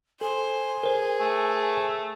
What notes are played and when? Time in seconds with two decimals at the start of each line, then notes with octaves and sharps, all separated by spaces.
0.21 A4 C5 G#5
0.83 G#4 A#4 C5
1.20 A3